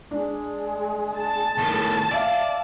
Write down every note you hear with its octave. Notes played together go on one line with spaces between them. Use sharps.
G#3 D4
A5
A2 D#3
D5 E5 F5 D6